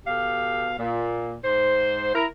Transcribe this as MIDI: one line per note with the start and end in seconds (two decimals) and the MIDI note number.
0.07 0.73 47
0.07 0.73 67
0.07 0.73 69
0.07 0.73 77
0.78 1.37 46
1.42 2.10 44
1.42 2.10 72
2.14 2.25 64
2.14 2.25 70